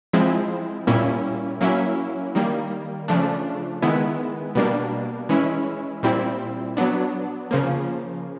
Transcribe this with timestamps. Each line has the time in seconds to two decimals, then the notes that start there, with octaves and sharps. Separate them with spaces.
0.13 F3 G#3 C4 E4
0.87 A#2 G3 A#3 C#4 E4
1.61 F#3 A#3 C#4 E4
2.35 D#3 G3 A#3
3.08 C#3 F3 A3 D4
3.82 D#3 G#3 B3 E4
4.55 B2 G3 A#3 D4
5.29 E3 G#3 C#4 E4
6.03 A#2 G3 C4 E4
6.77 F#3 B3 D4
7.51 C#3 F3 A#3